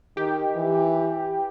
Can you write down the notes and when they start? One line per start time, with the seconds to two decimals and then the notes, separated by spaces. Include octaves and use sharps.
0.17 D#3 G4
0.56 E3